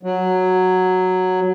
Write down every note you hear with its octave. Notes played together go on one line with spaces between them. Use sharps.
F#3